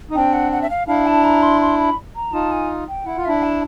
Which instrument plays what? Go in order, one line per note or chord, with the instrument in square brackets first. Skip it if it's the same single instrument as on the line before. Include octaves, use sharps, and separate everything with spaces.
[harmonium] D#4
[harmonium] C4 D4 [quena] G5
[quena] F#5
F#5
E5
F5
[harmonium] D4 E4 [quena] F5
[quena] A5
A#5
C6
C6
B5
A#5
[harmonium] D#4 F4 [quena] A5
[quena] G#5
G5
[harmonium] E4 [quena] F#5
[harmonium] F4
[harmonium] D4 E4 [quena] E5
[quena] A5